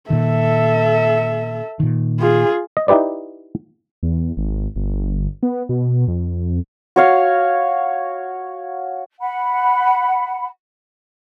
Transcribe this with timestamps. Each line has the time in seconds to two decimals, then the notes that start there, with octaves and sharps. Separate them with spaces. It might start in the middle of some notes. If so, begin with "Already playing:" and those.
0.10 A#2 D#3 A4 E5
1.80 A#2 D#3
2.20 F4 G#4
2.77 D#5
2.88 D#4 E4 G4 B4 D5
4.03 E2
4.37 G#1
4.76 G1
5.43 B3
5.69 B2
6.08 F2
6.96 F#4 C#5 F5
9.20 F#5 B5